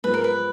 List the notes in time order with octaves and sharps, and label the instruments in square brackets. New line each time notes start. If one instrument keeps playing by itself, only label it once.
[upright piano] G#2 F3 G#3 B3 [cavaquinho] B4
[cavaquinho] A#4
B4